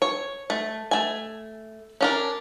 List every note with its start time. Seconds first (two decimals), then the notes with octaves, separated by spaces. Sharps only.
0.02 C#5
0.50 A3
0.91 A3 G#5
2.01 C#4 D4 A#4